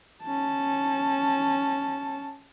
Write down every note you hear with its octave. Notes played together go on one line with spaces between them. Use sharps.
C#4 A5